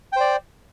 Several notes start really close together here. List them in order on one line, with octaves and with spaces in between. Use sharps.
G5 C5 D5